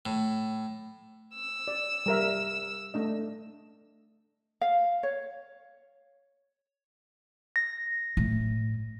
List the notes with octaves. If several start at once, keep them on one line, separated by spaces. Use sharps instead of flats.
A2
E6
D5
G3 A#4 E5
A3 D4 D#5
F5
C#5
A#6
A2